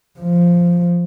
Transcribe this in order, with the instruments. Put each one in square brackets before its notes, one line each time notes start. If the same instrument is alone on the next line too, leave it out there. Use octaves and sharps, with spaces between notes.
[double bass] F3